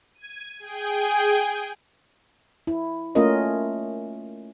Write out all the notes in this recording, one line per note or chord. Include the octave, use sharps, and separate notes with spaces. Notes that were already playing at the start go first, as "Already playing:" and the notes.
G#6 D#7
G#4 G5 G#5
E4
A3 A#3 C#4 F4 A#4 D#5